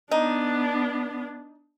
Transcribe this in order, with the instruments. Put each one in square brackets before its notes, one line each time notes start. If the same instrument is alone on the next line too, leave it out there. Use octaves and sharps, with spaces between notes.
[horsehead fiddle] B3 D4 [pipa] D#4